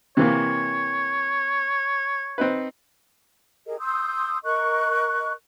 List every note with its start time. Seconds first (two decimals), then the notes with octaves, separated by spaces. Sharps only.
0.17 C3 E3 A#3 C#5
2.38 C4 D#4 B4
3.66 G4 G#4 A#4 D#5
3.79 C6 D#6 E6 G6
4.43 A#4 D#5 C#6 F#6